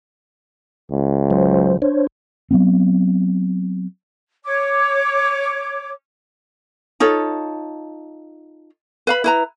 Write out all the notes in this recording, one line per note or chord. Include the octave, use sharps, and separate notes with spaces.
C#2
F#3 C5
D4 C5 C#5
F#3 B3 C4
C#5 D6
D#4 F4 A4 C#5
B4 F5 B5
E4 B4 A#5